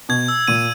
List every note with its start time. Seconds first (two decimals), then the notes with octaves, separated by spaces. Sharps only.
0.09 B2 G#6
0.28 E6
0.48 A#2 D#7